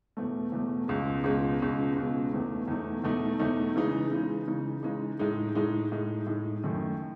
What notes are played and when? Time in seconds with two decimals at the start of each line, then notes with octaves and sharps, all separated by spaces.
0.17 E2 B2 A3
0.52 E2 B2 A3
0.88 C#2 B2 G#3
1.24 C#2 B2 G#3
1.60 C#2 B2 G#3
1.96 C#2 B2 G#3
2.31 E2 B2 A3 D#4
2.68 E2 B2 A3 D#4
3.04 E2 B2 A3 D#4
3.39 E2 B2 A3 D#4
3.76 C#3 E3 G#3 D#4
4.11 C#3 E3 G#3 D#4
4.48 C#3 E3 G#3 D#4
4.83 C#3 E3 G#3 D#4
5.19 A2 G#3 D#4
5.55 A2 G#3 D#4
5.92 A2 G#3 D#4
6.26 A2 G#3 D#4
6.64 F#2 D#3 A3